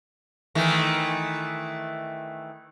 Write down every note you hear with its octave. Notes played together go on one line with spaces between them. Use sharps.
D#3 E3 A3